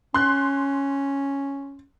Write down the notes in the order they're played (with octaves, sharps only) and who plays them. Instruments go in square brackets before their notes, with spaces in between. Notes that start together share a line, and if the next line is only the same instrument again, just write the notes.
[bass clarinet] C#4 [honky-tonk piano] C6 F#6